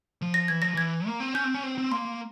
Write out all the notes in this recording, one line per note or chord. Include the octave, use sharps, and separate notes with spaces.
F3
A#6
E3 G#6
F3 A#6
E3 G#6
A#3
C4
C#4 G6
C4
C#4
C4
C4
A#3 C6